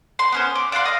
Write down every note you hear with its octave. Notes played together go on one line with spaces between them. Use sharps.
C6
B3 C#4 C5
D6
D5 F5 F#5 C6
D#5 F5